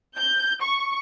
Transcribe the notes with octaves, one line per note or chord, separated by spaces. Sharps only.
G6
C#6